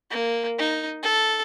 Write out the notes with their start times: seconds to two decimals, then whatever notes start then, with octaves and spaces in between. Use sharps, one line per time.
0.11 A#3
0.59 D#4
1.03 A4